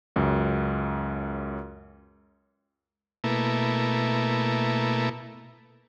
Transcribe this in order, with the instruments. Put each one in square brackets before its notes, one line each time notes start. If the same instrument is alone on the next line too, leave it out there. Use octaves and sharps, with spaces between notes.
[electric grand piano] C#2 F#2
[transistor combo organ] B2 A3 A#3 E4